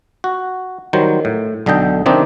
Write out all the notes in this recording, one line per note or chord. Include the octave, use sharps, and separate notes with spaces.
F#4
D#3 F#3 G3 C5
A2
B1 D3 A4 D#5 G5
C3 D#3 C4 D4 D#4 G4